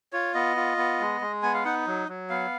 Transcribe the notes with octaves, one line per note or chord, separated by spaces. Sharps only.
F4 C#5
B3 D#5
F4
B3
G#3
G#3
B3 G#5
F5
D#4 F#5
F#3
F#3
B3 F5